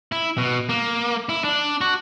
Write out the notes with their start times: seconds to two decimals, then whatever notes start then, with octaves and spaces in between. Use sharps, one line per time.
0.12 E4
0.38 B2
0.69 A#3
1.29 E4
1.44 D4
1.81 F#4